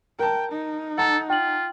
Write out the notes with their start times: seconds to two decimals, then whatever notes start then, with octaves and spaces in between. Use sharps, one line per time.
0.19 A#4 G5 A5
0.52 D#4
0.98 A4 F#5 A5 A#5
1.30 F4 G5 F#7